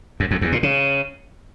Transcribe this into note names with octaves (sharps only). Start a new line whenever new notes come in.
F#2
F2
E2
A#2
C#3